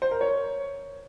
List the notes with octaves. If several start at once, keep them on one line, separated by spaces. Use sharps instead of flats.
C5
A#4
C#5